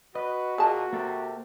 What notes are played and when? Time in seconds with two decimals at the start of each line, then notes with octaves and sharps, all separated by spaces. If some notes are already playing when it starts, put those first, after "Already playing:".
0.15 F#4 B4 D#5
0.58 A#2 G#4 A5
0.93 C3 A#3 A4